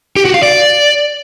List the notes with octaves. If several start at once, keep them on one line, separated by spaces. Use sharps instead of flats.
G4
F#4
F5
D5